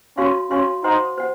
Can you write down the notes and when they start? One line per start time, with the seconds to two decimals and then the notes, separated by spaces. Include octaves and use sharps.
0.17 C#4 F#4 C#5 F5 C6
0.51 C#4 F#4 C#5 F5 C6
0.84 D#4 C5 F#5 C6
1.18 C5 F#5